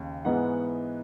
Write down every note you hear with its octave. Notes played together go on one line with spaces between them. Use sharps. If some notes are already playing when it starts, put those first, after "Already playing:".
Already playing: D#2 C#3
G#2 E3 G#3 B3 F#5